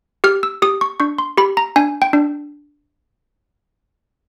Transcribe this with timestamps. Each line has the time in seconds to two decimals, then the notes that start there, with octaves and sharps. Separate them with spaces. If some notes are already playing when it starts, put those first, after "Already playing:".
0.24 G4 F6
0.43 E6
0.62 G4 D#6
0.81 C#6
1.00 D4 C#6
1.18 C6
1.37 G4 B5
1.57 A#5
1.76 D4 G#5
2.02 G5
2.13 D4